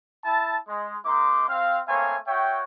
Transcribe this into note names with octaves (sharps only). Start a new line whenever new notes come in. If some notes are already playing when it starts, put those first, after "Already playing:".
E4 A5
G#3
G#3 A#3 D#4 C6 D6
C4 F5
A3 A#3 C4 C#5 F5 G#5
F#4 C#5 E5 G5